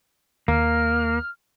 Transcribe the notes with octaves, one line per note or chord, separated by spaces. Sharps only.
D#2 A#3 F6